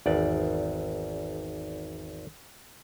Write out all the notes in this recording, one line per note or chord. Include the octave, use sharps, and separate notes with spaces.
G#1 E2 D5